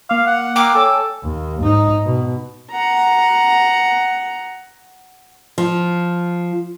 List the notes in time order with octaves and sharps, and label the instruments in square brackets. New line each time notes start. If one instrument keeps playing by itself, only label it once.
[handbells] A#3 D6 [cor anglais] F5
[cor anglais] F#5
[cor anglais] A#3 [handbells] G5 E6 [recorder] D6
[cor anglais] A4 [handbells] C#5 G#5
[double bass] D#2
G#2 D#4
B2
[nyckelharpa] F#5 A#5
[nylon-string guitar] F3